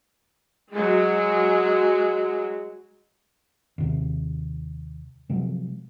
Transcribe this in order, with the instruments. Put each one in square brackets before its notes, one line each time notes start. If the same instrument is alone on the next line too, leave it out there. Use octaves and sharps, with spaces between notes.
[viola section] F#3 G#3
[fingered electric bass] D#2 C3
C3 F3 F#3 G#3